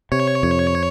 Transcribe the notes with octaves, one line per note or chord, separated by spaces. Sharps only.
C3 C#5
F2